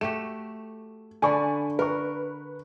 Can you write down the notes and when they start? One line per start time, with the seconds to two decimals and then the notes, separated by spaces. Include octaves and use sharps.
0.01 A3 F#4 G4 E7
1.22 D3 D4 D5 G#5 B5 C#6
1.79 A#4 B4 C#6